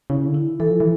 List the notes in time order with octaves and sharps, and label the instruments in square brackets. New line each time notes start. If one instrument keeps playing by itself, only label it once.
[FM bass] C#3 [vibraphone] E4
[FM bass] D3
[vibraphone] E4
[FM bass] E3 [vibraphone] A4
[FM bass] F3
E3